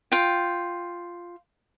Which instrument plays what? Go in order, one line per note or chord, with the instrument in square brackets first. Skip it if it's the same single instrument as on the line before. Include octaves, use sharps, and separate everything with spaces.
[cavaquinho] F4 G5